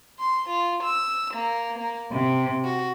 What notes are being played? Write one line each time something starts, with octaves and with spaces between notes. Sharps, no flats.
C6
F4
E6
A#3
A#3
C3
F#4